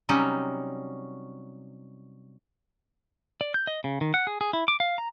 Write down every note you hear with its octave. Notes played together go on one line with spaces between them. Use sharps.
C3 F#3 G3 C#4 D#4
D5
G6
D#5
C#3
D#3
F#5
G#4
G#4
E4
D6
F5
A#5